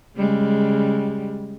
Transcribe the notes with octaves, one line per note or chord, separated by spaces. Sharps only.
C#3 G3 G#3